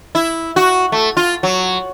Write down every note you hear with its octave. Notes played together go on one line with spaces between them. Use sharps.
E4
F#4
A3
F4
F#3